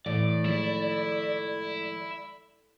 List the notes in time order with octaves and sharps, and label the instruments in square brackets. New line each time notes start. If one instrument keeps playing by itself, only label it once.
[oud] A2 [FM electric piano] E3 [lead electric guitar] D5
[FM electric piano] D#3 F3 G#3 [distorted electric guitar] E4